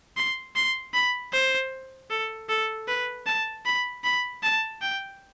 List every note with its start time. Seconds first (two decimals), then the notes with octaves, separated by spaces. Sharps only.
0.17 C6
0.56 C6
0.94 B5
1.33 C5
2.10 A4
2.49 A4
2.88 B4
3.26 A5
3.65 B5
4.04 B5
4.43 A5
4.82 G5